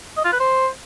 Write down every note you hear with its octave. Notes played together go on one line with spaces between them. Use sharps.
D#5
F4
B4
C5